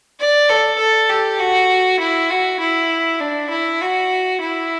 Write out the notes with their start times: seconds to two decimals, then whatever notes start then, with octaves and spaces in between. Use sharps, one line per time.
0.20 D5
0.49 A4
0.79 A4
1.09 G4
1.39 F#4
1.99 E4
2.30 F#4
2.59 E4
3.20 D4
3.50 E4
3.81 F#4
4.40 E4